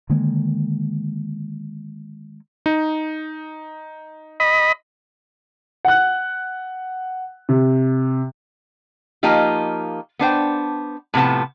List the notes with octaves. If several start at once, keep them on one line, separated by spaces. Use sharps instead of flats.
D3 D#3 G#3 A#3
D#4
D#5 B5
F#5 F#6
C3
F3 A#3 D#4 F4 G4
B3 D4 C5 G5
A2 C3 F3 B3 A5